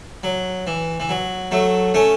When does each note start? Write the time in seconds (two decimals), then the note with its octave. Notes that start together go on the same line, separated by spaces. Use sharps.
0.23 F#3
0.67 E3
1.00 E3
1.09 F#3
1.51 F#3 A3
1.94 A3 C#4